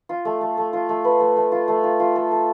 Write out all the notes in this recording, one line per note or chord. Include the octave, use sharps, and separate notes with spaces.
F4
A3
A3
A3
F4
A3
B4
A3
A3
F4
A3
F4
F4
A4
A4